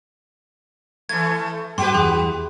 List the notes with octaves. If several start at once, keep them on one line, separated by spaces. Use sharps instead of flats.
E3 A3 G#6
G2 F#4 G4 B4 C6
E2 G#4